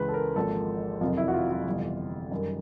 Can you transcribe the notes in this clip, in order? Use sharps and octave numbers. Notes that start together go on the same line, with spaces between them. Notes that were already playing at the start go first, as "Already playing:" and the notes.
Already playing: C#2 C#3 E3 B4
A4
A#4
G#1 G#2 F3 A#3 A4
F#1 F2 C3 D#3 F4
E4
F#4
F4
F4
G1 F2 C3 E3
F#2 D#3 G3